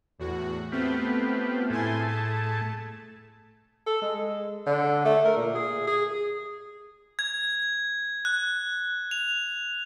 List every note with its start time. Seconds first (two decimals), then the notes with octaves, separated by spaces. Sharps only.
0.19 E2 A2 F#4
0.72 A3 B3 C4 F4 G4 B4
1.70 A2 A3 E4 G#4 G#5 C6
2.07 A5
3.87 A4
4.02 G#3
4.67 D3
5.05 A3
5.25 A#4
5.37 A#2
5.55 G#4
5.87 G#4
7.19 G#6
8.25 F#6
9.11 F7